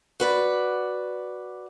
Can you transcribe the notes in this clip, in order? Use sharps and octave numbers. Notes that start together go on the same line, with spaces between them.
F#4 B4 D5